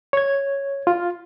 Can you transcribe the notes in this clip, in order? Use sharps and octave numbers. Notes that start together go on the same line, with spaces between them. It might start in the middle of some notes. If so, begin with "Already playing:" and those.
C#5 G#6
F4